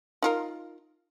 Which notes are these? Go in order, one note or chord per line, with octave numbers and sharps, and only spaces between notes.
D#4 F4 A#4